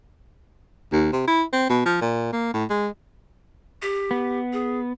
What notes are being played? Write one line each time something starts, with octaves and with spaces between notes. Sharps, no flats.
D#2
C3
E4
C4
B2
F3
A#2
A#3
A2
G#3
G4
B3
G#4